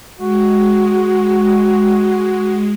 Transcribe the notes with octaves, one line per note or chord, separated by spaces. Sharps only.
G#3 F#4